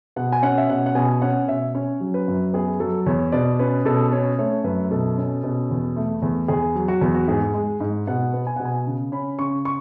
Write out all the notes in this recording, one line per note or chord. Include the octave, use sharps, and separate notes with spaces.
B2 F#5
G#5
C#4 F#5
E5
B2 F#5
F#5
B2 G#5
C#4 F#5
B2 E5
C#4 C#5
F#3
B4
F#2
B3 G#4
F#3 A4
E2 C#5
B2 D5
C#4 B4
B2 A4
C#4 C#5
A3 C#5
F#2 B4
B2 A4
C#4
B2
E2
A3
E2
E2 G#4
F#3
F#4
E2
F#4
G#2 G#4
G#3
G#2
B2 F#5
B3
G#5
B2 F#5
G#5
C#3
C#4 B5
C#3 C#6
C#6